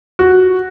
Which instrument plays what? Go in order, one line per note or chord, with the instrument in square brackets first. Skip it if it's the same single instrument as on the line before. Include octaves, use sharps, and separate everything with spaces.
[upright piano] F#4